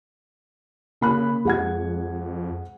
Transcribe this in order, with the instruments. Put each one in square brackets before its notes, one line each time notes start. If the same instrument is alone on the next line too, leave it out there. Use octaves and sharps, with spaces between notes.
[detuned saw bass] C#3 [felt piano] A#3 B5 F#6
[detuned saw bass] F2 [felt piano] G#3 F#5 G#6